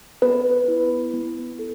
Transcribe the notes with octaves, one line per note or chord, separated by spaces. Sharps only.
B3 B4
E4
B3
A4